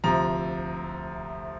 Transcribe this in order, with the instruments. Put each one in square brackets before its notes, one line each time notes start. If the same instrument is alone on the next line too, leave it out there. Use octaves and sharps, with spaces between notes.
[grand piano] D2 C3 F3 A#5